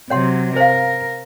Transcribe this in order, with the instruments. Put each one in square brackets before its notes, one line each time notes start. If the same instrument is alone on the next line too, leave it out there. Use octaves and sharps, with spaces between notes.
[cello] C3 F#3 [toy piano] C#5 F#5 C6
[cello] A#4 [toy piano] C5 F5